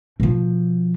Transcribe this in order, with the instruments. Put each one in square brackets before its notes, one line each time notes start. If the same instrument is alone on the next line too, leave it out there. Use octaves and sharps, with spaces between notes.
[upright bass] B2 F3